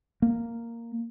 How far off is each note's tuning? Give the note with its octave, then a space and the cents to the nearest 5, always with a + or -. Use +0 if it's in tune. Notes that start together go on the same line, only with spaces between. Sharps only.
A#3 -5